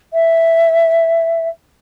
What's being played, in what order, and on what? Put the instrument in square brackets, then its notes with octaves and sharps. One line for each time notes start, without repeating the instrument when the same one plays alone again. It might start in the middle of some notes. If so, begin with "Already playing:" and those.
[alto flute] E5